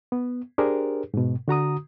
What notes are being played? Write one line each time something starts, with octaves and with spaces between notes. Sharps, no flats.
B3
D4 G4 G#4 A#4 C5
G#2 B2
D3 F#4 A#5 D#6